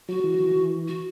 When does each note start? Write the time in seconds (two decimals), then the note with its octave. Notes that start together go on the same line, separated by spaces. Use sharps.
0.09 F#3 F#4
0.24 E3
0.40 E3
0.56 E3
0.88 F#4